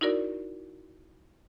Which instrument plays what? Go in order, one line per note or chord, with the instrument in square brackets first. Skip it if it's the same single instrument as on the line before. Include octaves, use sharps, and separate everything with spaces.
[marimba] D#4 E4 F#4 A#4 D5